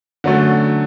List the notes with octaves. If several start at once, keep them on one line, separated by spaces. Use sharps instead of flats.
D3 F#3 A3 C#4